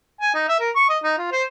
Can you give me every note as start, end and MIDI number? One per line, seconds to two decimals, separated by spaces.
0.21 0.34 80
0.34 0.47 63
0.49 0.56 76
0.60 0.70 70
0.76 0.86 85
0.89 0.98 75
1.03 1.13 63
1.18 1.28 65
1.32 1.43 72